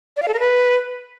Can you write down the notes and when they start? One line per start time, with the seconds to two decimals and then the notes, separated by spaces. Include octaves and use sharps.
0.17 D5
0.22 F5
0.28 A4
0.34 A#4
0.39 B4